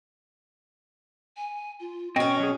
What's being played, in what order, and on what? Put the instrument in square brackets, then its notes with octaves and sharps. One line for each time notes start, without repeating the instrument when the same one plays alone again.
[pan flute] G#5
F4
[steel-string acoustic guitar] B2 C#4 [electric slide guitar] C4 D#5 G5 [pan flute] C#6
[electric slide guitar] F#3 G#4